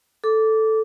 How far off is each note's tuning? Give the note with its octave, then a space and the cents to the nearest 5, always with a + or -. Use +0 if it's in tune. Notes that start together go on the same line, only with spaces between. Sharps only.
A4 +0 D6 -15